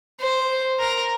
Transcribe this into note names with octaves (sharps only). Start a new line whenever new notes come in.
C5
A#4